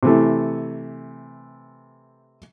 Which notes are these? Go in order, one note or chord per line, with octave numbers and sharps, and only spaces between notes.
C3 E3 A3